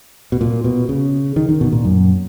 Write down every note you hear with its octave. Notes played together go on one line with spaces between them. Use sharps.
B2
A#2
B2
C#3
D#3
D#3
B2
A#2
F#2